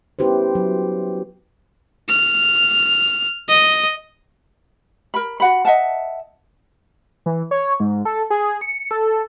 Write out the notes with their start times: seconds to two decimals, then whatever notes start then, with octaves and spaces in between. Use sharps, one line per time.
0.19 B3 C#4 E4 G4 B4 C5
0.55 F#3
2.09 F6
3.49 D#5
5.14 A#4 B5
5.40 F#4 F#5 B5
5.65 D#5 E5 F#5 A5
7.26 E3
7.51 C#5
7.80 G#2
8.05 A4
8.30 G#4
8.61 C#7
8.91 A4